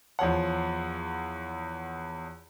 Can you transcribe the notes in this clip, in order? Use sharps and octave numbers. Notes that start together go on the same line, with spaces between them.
E2 F3 C#5 F#5